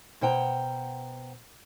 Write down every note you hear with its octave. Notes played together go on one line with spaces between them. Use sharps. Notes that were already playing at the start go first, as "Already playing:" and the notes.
B2 C5 F#5 G5 A5 A#5